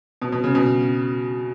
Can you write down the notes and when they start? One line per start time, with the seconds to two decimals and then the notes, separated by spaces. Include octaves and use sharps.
0.22 B2
0.32 B2
0.44 C#3
0.55 B2